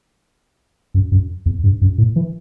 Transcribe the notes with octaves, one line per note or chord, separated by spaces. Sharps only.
F#2
F#2
E2
G2
F#2
A2
E3